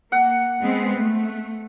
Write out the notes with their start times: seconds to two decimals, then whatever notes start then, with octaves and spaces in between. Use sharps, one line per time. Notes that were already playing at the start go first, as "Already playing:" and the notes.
0.12 A#3 F#5
0.61 G#3 B3 C4
0.97 A3